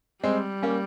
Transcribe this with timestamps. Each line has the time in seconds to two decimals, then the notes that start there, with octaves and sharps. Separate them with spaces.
0.24 G3 G#3 C4
0.63 A#3 C#4